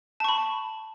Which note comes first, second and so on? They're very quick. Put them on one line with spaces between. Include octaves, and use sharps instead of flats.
A5 C#6 B5